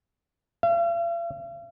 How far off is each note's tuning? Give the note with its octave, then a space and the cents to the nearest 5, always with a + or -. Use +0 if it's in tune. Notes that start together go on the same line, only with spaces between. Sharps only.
F5 -45